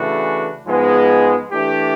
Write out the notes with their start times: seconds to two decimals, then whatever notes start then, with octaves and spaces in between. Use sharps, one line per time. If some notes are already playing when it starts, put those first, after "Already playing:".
Already playing: C#3 E3 A3 D4 F#4
0.65 G#2 F3 G#3 B3
1.51 E3 A3 D4 G4